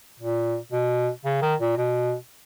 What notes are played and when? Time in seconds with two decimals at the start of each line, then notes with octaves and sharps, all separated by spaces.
0.20 A#2
0.72 B2
1.25 C#3
1.42 D#3
1.60 A#2
1.77 B2